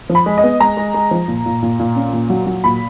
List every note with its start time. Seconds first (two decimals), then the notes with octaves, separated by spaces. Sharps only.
0.10 F3
0.15 B5
0.26 G#3
0.38 D#5
0.43 B3
0.60 G#3 A#5
0.77 G#3
0.94 G#3
1.11 F3
1.28 A#2
1.46 A#2
1.63 A#2
1.80 A#2
1.96 C#4
2.13 A#2
2.30 F#3
2.47 F#3
2.64 A#2 B5